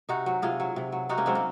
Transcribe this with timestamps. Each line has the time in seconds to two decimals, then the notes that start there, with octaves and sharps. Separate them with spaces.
0.09 C3 D#4 F#4
0.26 F#3
0.42 C3 F4 G#4
0.60 F#3
0.76 C3
0.92 F#3
1.09 C3 D#4 F#4
1.18 A#3 C#4
1.26 F#3 G#3 C4
1.35 A#3